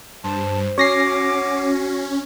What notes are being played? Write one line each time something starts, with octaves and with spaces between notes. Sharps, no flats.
G2 C5 A5
C#4 F#4 C#5 D6 A#6 C7